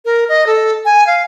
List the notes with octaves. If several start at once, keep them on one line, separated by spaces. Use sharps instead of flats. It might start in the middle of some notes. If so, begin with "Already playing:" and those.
A#4
D#5
A4
G#5
F5